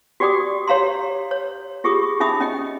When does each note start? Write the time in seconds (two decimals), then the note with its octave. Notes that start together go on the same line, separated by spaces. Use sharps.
0.20 F#4 G4 D5 G5 D6 D#6
0.68 G4 C#5 F5 A#5 C6
1.31 C#5
1.84 F4 G4 G#4 C#6 D#6
2.20 C#4 D#4 E5 B5 D#6
2.40 C#4 D#5 G5